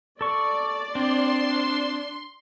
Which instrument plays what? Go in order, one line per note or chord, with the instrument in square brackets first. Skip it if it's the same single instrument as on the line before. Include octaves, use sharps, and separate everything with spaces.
[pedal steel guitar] A4 C#6 [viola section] D5
[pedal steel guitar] C4 [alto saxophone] D4 [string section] C6